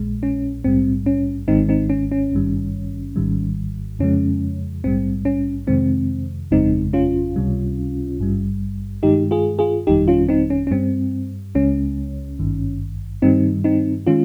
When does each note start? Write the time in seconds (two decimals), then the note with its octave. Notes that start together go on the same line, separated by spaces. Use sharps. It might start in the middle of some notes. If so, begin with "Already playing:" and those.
Already playing: A#1 A#2 G#3
0.23 C#4
0.64 A#1 G#2 G3 C4
1.06 C#4
1.48 G#1 G#2 D#3 G#3 C4 D#4
1.69 C4 D#4
1.90 C#4
2.11 C#4
2.32 G#1 G2 D#3 G3
3.16 G#1 G#2 D#3 G3
3.99 F2 C#3 F3 G#3 C#4
4.84 A#1 G#2 G3 C4
5.25 C#4
5.67 F2 C3 D#3 G#3 C4
6.51 G1 F2 C#3 G#3 C4 D#4
6.93 C#4 F4
7.36 C#2 C3 G3
8.19 G#1 G2 G3
9.03 G2 D#3 G#3 D#4 G4
9.31 F4 G#4
9.59 F4 G#4
9.87 G1 F2 D#3 G3 D#4 G4
10.08 C#4 F4
10.29 C4 D#4
10.50 C#4
10.67 C#4
10.71 G2 G3 C4
11.55 C#2 C#3 G#3 C#4
12.39 G#1 G2 D#3
13.22 G2 D#3 G3 C4 D#4
13.64 C4 D#4
14.06 D#3 G#3 C#4 F4